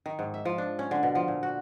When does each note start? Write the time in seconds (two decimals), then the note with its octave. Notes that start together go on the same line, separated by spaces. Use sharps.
0.06 D#3
0.19 G#2
0.34 E5
0.45 F3
0.58 D4
0.79 C#4
0.91 D3
1.03 B2
1.15 F3
1.28 A#2
1.43 F#4